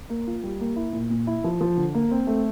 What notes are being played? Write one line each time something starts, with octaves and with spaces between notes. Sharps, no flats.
A#3
F4
G3
A#3
E4
A#2
A#2
E4
F3
F3
D3
A#3
C4
A3